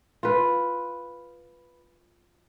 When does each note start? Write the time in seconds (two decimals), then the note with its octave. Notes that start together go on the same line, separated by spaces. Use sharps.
0.23 F4 B4